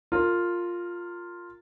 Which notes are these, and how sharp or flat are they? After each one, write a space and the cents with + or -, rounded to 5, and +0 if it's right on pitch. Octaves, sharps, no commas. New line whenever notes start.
F4 +0 A#4 -25